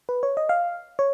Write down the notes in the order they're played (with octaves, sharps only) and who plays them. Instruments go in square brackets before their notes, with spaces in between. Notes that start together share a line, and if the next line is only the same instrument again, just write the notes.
[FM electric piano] B4
C#5
D#5
F5
C#5